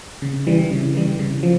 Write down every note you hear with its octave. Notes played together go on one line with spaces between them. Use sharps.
C#3
E3 G3
C#3
E3 G3
C#3
F3